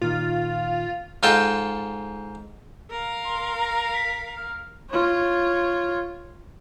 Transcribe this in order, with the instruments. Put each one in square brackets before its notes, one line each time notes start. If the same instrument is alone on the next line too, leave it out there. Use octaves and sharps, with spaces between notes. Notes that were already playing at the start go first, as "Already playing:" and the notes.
[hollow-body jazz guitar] A#2 D#3 [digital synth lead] F4
[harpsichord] G#2 F4 A4 G5 A5
[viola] A#4 F5
[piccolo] C6
A#5
B6
F6
[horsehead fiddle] F4 C#5